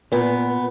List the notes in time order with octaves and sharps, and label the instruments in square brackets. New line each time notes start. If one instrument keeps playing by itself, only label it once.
[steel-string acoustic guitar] A#2 B3